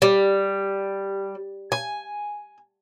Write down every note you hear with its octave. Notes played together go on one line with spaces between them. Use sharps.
G3
G#5